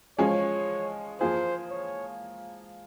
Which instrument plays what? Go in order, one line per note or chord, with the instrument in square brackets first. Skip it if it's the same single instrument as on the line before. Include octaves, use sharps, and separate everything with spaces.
[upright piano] F3 G#3 C#4 G#4 [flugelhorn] C#5
[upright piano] F3 A#3 F4 G#4 [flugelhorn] C5
[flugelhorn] C#5